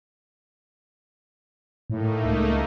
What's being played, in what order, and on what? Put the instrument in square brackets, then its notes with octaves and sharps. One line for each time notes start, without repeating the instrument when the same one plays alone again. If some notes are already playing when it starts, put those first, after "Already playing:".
[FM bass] A2 [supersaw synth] A3 A#3 D#4
[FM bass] C#2